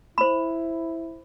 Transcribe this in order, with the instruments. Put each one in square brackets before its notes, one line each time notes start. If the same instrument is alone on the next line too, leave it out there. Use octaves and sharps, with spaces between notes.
[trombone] E4 [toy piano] C5 B5